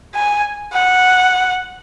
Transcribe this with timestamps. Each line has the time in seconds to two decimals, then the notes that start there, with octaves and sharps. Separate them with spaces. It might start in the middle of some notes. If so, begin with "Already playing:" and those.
0.15 G#5
0.73 F#5